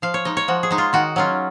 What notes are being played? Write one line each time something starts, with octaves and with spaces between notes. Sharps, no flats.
F3 F5
C#5
G#3 D#4 D#5
C#5
F3 F#4
G#4
G#3 D#4
F4
D#3 F#4
F#3 C#4 F4